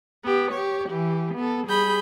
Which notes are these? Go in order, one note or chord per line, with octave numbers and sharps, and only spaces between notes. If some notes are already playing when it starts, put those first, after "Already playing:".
B3 G4
G4 C#5
E3 G4
B3 A4
G3 G#4 B5 G6